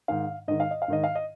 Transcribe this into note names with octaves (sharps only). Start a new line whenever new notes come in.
G#2 D#3 F5
G#2 D#3 D#5
F5
D#5
F5
G#2 D#3 D#5
F5
D#5